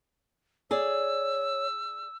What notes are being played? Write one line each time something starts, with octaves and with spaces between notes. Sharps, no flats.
G#4 C#5 D5 E6